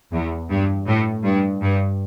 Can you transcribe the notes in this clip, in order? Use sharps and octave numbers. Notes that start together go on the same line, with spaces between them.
E2
G2
A2
G2
G2